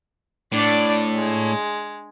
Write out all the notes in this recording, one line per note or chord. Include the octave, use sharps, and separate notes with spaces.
A2 D4 D5
G#3